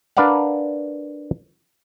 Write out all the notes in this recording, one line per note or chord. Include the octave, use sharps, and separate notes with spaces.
D4 A#4 B4 D5 F5 F#5